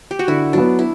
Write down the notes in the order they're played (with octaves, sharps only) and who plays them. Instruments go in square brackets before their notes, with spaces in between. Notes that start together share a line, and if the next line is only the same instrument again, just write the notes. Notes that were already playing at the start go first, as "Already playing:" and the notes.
[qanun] G4
F#4
[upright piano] D3 [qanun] E4
[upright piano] F#3 B3 [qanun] D4
[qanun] E4